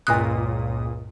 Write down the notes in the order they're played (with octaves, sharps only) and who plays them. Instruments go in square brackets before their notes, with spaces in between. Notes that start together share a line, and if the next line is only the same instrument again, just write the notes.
[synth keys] C#2 A#2 D#6 [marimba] G2 F#6